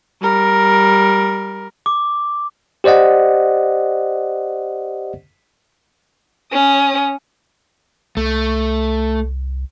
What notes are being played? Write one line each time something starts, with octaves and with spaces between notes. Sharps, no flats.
G3 A#4
D6
G4 C5 D5 D#5 F#5
C#4 D#6
C2 A3